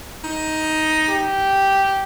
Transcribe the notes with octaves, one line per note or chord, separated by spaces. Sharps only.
D#4
G4